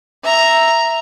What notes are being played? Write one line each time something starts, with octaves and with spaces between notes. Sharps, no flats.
E5 A#5